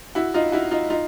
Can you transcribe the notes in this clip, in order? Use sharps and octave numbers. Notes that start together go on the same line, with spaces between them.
E4 F#4
D#4 F4
E4 F#4
D#4 F4
D#4 F4